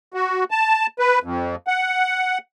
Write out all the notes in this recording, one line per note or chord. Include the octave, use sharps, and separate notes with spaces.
F#4
A5
B4
F2
F#5